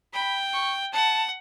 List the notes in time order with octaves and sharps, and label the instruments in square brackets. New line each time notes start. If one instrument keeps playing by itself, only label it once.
[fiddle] G5 [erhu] B5
[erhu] C#6
[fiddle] F#5 [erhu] A5